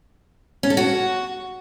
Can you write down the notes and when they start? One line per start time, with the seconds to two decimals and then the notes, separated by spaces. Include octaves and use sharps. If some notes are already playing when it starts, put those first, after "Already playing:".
0.63 C#4
0.70 A4
0.77 F#4